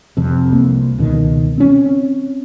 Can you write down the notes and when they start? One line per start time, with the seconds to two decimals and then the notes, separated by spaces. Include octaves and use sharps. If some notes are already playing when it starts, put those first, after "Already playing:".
0.17 F2 C3
0.52 C2 A#3
0.98 C#2 B2 D#3
1.58 C4 C#4